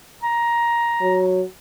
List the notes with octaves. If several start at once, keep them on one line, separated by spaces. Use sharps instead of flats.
A#5
F#3